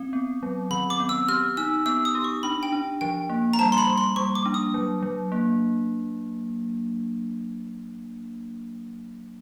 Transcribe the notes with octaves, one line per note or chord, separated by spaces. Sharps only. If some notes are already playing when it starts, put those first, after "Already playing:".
Already playing: C4
B3
F#3
D#3 B5
D6
B3
E6
G4 F6
D#4 E6
B3 E6
D#6
G4
C#6
D4 B5
G5
D4
F3 G5
A#3
A#5
G3 A5
C6
B5
G3
C6
G3 C#6
D6
D4
D#6
F#3
F#3
A#3